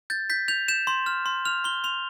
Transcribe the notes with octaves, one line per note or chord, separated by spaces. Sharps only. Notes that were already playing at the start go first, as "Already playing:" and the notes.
G6 A6
G6 B6
G6 F7
G6 E7
C6
F6
C6
F6 F7
C6 G7
C6 F7